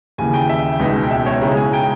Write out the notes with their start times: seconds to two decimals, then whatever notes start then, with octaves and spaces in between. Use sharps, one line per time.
0.18 D#2 C#3 E3 G#5
0.34 G5
0.49 E5
0.80 C#2 B2 G#3 B3 D#4
1.03 G5
1.11 E5
1.26 C#5
1.41 C#3 G#3 C#4 E4 A#5
1.57 G#5
1.73 G5